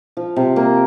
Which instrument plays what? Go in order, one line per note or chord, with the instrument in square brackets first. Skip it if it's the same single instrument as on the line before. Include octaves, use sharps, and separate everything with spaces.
[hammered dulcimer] F3
C3
A#3